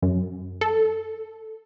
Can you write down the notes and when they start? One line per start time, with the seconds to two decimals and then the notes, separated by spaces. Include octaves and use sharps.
0.02 F#2
0.61 A4